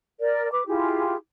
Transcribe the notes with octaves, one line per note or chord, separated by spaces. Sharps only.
A#4 D5
B4 D6
E4 F4 G4 G#4